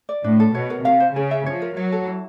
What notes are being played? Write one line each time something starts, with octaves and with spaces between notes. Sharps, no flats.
D5
A2 D4
A4
B2 C#5
A#4
C3 F5
C5
C#3 G#4
E5
F3 C#5
A#4
F#3 C#5
A4
E4